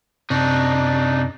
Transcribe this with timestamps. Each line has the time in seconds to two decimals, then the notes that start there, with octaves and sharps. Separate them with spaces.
0.30 F#2 C3 D4 D#4